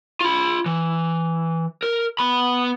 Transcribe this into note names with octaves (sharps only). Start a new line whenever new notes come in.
F4 B5
E3
A#4
B3 B5